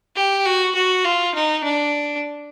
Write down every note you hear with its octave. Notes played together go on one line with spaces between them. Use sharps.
G4
F#4
F#4
F4
D#4
D4